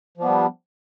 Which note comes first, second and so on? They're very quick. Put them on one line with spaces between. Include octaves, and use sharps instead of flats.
F3 D4 B3 G3